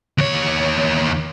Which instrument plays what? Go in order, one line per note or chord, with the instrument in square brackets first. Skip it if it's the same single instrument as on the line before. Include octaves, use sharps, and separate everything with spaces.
[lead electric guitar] D#2 C#5